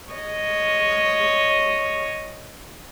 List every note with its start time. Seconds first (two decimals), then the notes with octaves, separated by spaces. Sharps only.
0.13 C#5 D#5